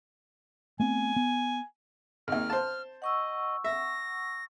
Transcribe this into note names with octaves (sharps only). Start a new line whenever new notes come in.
A3 B3 C4 G#5
B3
G#1 D#2 F6
C5 A5
D#5 F#5 C#6 E6
E5 A#6